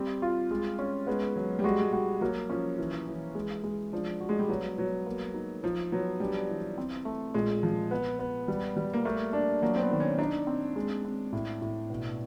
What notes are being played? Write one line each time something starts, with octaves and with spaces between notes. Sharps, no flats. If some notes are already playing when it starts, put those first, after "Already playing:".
Already playing: G3 C4
F4
G#3
C#4
G#3 B3
F#3
G3
G#3 F#4
G#3
G3 F#4
F#3 A#3
F3 C#4
E3
E3
G#3
G#3
F3 D4
F#4
G#3
G3
F#3 B3
F#3 B3
A#3
D#4
F3 D#4
F#3 B3
G3 D4
E3
C4
A3
A#2 G#3
F3
B3
B3
G3
G3
A#3
A3 A#3
D4
F#3 A#3
C4
B3
D#3
C#4
D4 D#4
C4
G#3
C4
A2
A2
B2